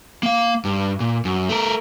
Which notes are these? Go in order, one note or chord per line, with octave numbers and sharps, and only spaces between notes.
A#3 F5
G2
A#2
F#2
A3 A#4